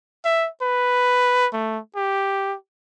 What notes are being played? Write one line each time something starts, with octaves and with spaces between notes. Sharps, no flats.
E5
B4
A3
G4